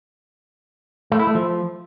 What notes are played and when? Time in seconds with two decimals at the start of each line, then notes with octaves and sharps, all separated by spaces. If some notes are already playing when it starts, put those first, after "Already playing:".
1.12 A3
1.19 E4
1.27 A3
1.35 F3